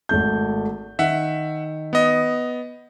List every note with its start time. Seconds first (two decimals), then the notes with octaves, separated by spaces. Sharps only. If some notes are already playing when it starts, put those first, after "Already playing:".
0.09 G#1 A3 G6
0.99 D#3 E5 F#5
1.93 B3 D#5